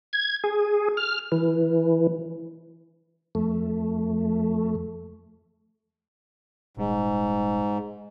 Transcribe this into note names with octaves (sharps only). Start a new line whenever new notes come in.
G#6
G#4
F6
E3
F2 A3
D#1 G#2